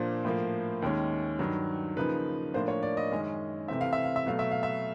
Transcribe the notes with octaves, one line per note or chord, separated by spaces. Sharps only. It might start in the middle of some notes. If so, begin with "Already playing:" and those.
Already playing: A#2 F3 A#3 D4 C5
A2 F3 A#3
D#2 D#3 G#3 C#4
G2 D#3 F#3
C#3 F3 A#3 D#4 B4
A2 F3 A#3 D4 C5
C#5
D5
D#5
F#2 D#3 G#3 C#4
C3 E3 A3 C4 E5
F5
E5
F5
E5
B2 F#3 A3 F5
E5
F5
E5